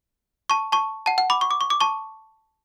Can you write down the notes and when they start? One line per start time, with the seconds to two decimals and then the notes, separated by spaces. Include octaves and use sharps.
0.50 A5 C#6
0.72 A5 C#6
1.06 F#5 A5
1.18 F#5
1.30 B5 D6
1.41 C#6
1.51 D6
1.61 C#6
1.70 D6
1.80 A5 C#6